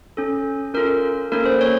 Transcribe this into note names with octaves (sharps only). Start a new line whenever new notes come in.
C#4 A4
C#4 F4 A4 A#4
A#3 C#4 A4 A#4
C5
C#5